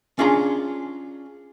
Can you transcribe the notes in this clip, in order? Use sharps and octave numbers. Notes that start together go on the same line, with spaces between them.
C#4 D4 F4 G#4 A#5